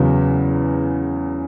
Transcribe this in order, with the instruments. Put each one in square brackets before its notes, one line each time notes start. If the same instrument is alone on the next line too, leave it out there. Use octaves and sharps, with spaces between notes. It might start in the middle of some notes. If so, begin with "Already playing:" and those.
Already playing: [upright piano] E2 C#3 F#3 B3